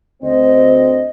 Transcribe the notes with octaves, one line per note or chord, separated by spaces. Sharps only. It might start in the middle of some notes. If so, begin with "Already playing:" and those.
D2 C4 D#5